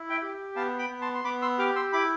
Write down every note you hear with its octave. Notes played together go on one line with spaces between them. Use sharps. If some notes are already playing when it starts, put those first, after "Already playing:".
Already playing: E4
E5 G5
G4
B3 F5 A5
G5 B5
B3
A5 C6
C6
B3 B5 D6
C6 E6
G4 D6 F6
C6 E6
E4 B5 D6